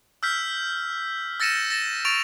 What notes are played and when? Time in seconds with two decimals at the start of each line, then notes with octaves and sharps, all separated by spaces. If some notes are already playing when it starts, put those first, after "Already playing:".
0.23 E6 F6 G6 B6
1.40 E6 A6 A#6 C#7 D#7 E7
1.70 A6 A#6 E7
2.05 C#6 A6 D7 F7